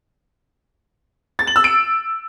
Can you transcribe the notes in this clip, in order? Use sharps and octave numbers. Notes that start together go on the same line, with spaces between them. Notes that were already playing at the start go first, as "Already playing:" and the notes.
A6
F#7
E6
D7